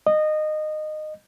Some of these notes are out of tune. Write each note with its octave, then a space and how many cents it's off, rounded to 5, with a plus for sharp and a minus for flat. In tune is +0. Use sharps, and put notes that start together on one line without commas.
D#5 -20